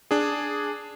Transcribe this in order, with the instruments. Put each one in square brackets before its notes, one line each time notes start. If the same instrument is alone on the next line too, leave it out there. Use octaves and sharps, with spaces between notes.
[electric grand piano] D4 G#4